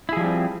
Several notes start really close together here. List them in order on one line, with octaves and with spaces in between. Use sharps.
E4 G#4 F3 G3 C4